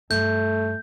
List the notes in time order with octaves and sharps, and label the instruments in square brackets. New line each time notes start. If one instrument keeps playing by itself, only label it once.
[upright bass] G2 G3 [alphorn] A3 [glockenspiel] G6